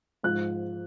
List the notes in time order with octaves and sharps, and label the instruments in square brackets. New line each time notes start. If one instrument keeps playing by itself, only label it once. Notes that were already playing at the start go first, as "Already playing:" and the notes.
[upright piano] G#2 F3 F#6